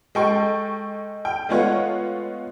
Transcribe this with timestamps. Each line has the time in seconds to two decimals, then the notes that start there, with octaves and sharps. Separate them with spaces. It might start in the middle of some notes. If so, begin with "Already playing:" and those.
0.15 G#3 A4 G5 C#6
1.25 G5
1.49 G#3 A3 B3 F4 C#5 F#5